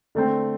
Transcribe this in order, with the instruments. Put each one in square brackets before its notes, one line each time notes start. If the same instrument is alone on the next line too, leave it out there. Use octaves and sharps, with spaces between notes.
[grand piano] D3 A3 C4